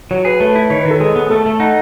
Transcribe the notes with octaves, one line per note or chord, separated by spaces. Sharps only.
F#3 C#5
G#4 B4
A3 B4
E4
D#3 C#5
B4
D#3
A4
G#3 G#4
B3
A3 A4
A3
D#4 F#5